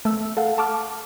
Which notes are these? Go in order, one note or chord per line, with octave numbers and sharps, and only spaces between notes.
A3 E6
A4 F5 F#5
A5 C#6 D6 F6